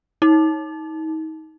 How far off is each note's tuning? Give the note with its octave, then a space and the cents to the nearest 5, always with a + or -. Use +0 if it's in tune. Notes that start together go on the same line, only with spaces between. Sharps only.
D#4 +35